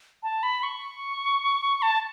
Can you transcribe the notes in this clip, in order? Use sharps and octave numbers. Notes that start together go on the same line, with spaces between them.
A5
B5
C#6
A5